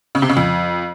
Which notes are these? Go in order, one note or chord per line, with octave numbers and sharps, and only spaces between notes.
C#3
C3
C#3
F2